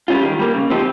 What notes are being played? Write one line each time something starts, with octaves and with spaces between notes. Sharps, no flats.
G3 C#4 F4
D#3
G3 A#3
C#3
F3 C4 D#4 G4